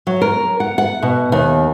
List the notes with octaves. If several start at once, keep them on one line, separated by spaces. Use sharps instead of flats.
F#3
A#4
F#5
F#5
B2
D#2